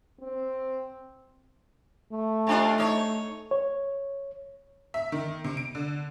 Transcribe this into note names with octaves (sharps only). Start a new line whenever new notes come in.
C4
A3
C3 D4 F4
D#4 C#5
C#5
E5
D#3
C3
D7
D3